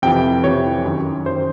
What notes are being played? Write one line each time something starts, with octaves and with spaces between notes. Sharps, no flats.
F2 C3 E3 G5
F2 C3 E3 C#5
F#2 D#3
F#2 D#3 C5